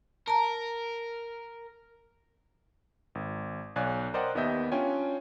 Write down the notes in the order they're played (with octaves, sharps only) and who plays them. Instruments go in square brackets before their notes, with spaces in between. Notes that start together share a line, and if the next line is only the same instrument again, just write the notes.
[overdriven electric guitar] A#4 [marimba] A5 A#5
[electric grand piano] G#1
B1 C#5 D5 F5 G#5 F#6
A#4 C5 D5 D#5 F#5 G5
D#2 B3 G4 D#5 E5 G6
C#4 D4 F4 C#5 G5 G#5